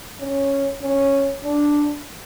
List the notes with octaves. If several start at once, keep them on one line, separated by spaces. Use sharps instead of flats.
C#4
C#4
D4